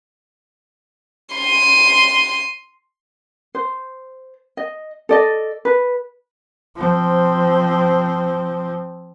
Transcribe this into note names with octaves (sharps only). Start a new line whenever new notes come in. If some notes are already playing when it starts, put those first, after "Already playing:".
C6 D#7
C5
D#5
A4 D5 D#5
B4
F3 C4